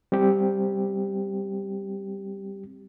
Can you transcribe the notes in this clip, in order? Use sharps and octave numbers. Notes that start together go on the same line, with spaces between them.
G3 C4 G4